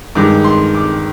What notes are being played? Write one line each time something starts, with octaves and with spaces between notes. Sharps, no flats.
G2 D#3 G#3 D6
C6
D6